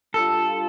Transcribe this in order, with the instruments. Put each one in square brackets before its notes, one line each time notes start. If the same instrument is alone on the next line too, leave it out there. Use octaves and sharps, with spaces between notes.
[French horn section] G3 D4 F4 [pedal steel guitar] A4